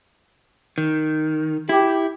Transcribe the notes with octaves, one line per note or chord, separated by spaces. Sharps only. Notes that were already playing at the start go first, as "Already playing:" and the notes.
D#3
E4 G4